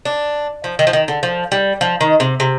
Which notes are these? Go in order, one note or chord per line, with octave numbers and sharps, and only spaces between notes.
D4
F3
D#3
F3
D#3
D3
F3
G3
F3
D#3
C3
C3